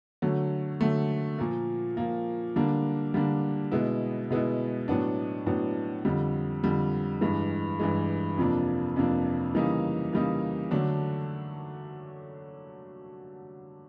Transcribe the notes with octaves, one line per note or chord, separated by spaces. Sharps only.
D3 F#3 A3
D3 F#3 A3
A#2 F3 A#3
A#2 F3 A#3
D3 G3 A#3 D4
D3 G3 A#3 D4
B2 G#3 B3 E4
B2 G#3 B3 E4
A2 F#3 B3 D4
A2 F#3 B3 D4
F2 D3 G3
F2 D3 G3
G2 E3 G#3
G2 E3 G#3
F2 C3 F3 A#3 D4
F2 C3 F3 A#3 D4
C#3 E3 G3 A#3 D#4
C#3 E3 G3 A#3 D#4
D3 F#3 A3 D4